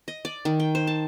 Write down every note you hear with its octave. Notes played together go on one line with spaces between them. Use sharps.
D#5
D5
D#3
G5
C5
A5